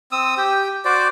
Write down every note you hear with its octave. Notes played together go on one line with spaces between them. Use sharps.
C4 D#6 E6
G4 G5
F#4 C5 D5 D6